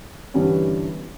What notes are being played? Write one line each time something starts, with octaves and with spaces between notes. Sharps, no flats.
G2 D3 E3 G3 B3 C#4